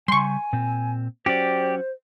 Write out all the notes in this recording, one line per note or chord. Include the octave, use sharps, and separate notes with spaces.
C#3 G3 G#5 C6 C#6
A#2 C4
F#3 C#4 F#4 G4 C5 D5